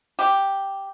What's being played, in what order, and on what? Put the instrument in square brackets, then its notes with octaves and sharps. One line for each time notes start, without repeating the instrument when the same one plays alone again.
[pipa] G4